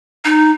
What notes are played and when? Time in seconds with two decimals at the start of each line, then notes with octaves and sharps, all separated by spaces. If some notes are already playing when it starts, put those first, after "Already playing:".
0.25 D#4